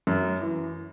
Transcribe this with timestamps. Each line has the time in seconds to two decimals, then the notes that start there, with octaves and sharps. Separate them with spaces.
0.07 F#2
0.41 E3